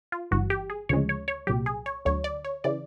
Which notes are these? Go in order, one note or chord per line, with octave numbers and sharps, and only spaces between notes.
F4
G1 G2 E3 F#4
G4
G#4
D2 C#3 F3 G#3 C#5
C#5
C#5
C2 A#2 F#3 G4
G#4
C#5
D2 D3 F#3 C#5
D5
C#5
C#3 E3 D5